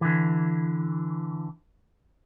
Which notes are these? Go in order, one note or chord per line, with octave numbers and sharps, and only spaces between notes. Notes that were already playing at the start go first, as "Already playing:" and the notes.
D3 E3